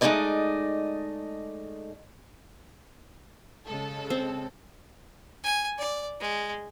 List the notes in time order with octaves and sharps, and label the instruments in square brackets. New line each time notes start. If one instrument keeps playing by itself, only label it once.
[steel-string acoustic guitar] G#3 A3 B3 D#4 D5 D#5
[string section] C#3 G#3 A4
[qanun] C4
[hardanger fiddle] G#5
D5
G#3